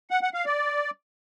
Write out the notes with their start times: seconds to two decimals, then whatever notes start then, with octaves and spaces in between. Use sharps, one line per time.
0.10 F#5
0.22 F#5
0.34 F5
0.46 D5